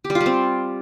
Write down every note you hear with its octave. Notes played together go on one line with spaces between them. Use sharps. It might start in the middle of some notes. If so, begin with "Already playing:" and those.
G4
G3
F4
G3
C4